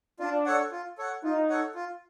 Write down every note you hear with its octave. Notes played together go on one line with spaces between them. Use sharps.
D4 F4
A4 C#5 F#5
F4
A4 C#5 F#5
D#4 F4
A4 C#5 F#5
F4